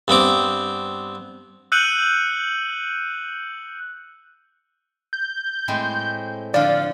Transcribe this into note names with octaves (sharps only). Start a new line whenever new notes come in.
G2 B3 C4 D6
E6 F#6 G6 C#7 D#7 F#7
G6
A2 G#3 C4
D3 F3 D5 F5